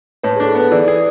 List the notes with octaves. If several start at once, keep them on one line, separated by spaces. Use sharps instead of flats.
A2 B4
G#4
D4 A4
G#4
B3 A4
E3 D5
G#4